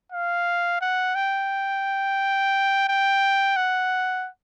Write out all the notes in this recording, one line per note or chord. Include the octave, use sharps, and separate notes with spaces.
F5
F#5
G5
G5
F#5